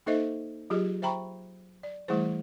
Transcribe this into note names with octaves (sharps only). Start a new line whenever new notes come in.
A#3 D#4 A4 C5 D#5 E5
F#3 F4 G4 G#4 D#5
C5 E5 G5 A#5 B5 C#6
D5
E3 G3 A3 E4 G#4 C5